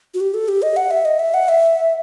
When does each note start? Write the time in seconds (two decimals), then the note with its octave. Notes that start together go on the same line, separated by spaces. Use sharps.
0.14 F#4
0.20 G4
0.34 A4
0.48 G4
0.62 D#5
0.76 F#5
0.91 E5
1.05 D#5
1.19 E5
1.34 F#5
1.48 E5